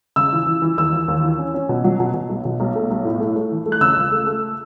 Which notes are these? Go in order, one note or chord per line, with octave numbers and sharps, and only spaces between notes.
C#3 E6
E3
E3
E3
D#2 E6
E3
D#2
E3
C#4
C#4
B2
F#3
B2
B2
B1
B2
B1
A3
B1
A2
A3
A3
E3
A3
F#6
C#3 E6
C#2
A3
A3